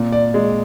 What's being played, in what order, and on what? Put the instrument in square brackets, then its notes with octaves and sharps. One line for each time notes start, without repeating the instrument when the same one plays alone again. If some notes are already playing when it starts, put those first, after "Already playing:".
Already playing: [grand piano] A#2
D5
G#3